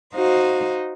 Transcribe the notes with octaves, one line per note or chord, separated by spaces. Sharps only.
D#4 F#4 C5 F5